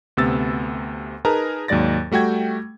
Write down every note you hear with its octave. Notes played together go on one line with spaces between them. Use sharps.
D2 C3 B3 E6 A6
D#4 G#4 A#4 B4 A5 A#5
D#2 G#2 F#3 D5 A6 A#6
G3 A3 F#4 G5 G#6